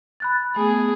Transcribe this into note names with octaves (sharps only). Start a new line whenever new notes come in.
B5 F#6 A6
A3 B3 G#4